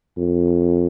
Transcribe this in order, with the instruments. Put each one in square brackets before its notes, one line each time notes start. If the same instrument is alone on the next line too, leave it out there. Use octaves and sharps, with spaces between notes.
[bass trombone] F2